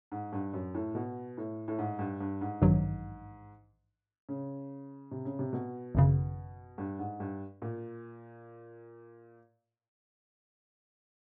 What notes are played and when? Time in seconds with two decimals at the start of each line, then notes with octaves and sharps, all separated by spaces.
0.12 G#2
0.33 G2
0.54 F#2
0.74 A2
0.95 B2
1.37 A2
1.68 A2
1.79 G#2
1.99 G2
2.20 G2
2.41 G#2
2.62 A1 G2 D#3 F#3
4.29 C#3
5.11 C3
5.25 C#3
5.39 C3
5.53 B2
5.95 G#1 F#2 C#3
6.78 G2
6.99 G#2
7.20 G2
7.62 A#2